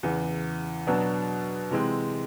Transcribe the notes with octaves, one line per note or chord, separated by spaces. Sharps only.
E2 C#3 E3
B2 F#3 B3 D4
C3 E3 G#3 C4